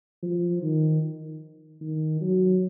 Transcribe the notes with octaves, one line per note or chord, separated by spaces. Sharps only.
F3
D#3
D#3
F#3